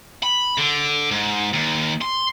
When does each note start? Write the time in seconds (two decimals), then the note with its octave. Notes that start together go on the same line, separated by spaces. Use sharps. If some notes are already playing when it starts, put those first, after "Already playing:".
0.23 B5
0.58 D3
1.11 G#2
1.53 D#2
2.02 C6